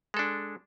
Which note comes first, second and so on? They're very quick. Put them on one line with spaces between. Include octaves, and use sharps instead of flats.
G#3 A4 D4